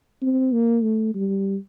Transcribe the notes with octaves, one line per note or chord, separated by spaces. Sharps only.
C4
A#3
A3
G3